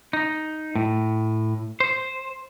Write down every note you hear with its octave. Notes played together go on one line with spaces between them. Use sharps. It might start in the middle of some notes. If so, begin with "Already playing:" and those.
D#4
A2
C5